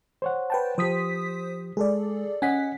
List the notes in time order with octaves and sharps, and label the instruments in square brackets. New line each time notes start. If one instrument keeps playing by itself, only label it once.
[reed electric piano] C5 C#5 F#5
[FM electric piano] B4 G5 A5
[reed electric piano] F3 G4 [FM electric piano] C5 D#6 B6
[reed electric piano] G#3 [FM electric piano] G#4 A4 D5
[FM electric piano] C#4 F#5 B6 [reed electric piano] D#5 G#5